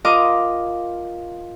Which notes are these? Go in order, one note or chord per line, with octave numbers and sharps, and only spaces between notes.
F4 A#4 D#5 D6 D#6